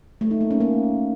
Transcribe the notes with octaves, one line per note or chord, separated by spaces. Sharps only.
A3
D#4
A#3
C#4
A#3